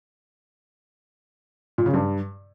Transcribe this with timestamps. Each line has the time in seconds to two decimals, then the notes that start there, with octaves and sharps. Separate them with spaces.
1.78 A#2
1.86 C#3
1.94 G2